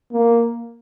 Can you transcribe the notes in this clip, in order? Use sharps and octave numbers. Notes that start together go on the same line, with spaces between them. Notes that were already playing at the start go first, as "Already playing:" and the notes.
A#3